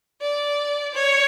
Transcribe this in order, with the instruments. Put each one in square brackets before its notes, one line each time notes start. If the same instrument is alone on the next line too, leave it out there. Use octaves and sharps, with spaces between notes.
[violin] D5
C#5